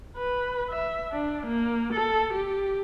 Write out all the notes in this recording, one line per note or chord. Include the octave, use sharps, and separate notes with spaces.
B4
E5
D4
A#3
A4
G4